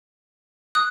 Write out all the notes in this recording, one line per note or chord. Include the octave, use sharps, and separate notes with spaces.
D#6 F#6